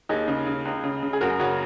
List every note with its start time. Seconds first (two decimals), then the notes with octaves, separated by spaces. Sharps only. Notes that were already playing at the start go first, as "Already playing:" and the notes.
0.09 D#2 D#4 G#4
0.28 C#3
0.47 C#3
0.65 C#2
0.84 C#3
1.03 C#3
1.13 G#4
1.21 F#2 F#4 A#4
1.39 C#3 C#4 F#4